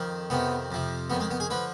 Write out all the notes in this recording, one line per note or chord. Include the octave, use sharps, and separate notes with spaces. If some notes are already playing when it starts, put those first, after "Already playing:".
Already playing: F2 D#3
F2 C3 D#3 B3
F2 C3 F3
F2 D#3 B3
G#3
B3
G#4
D3 F3 B4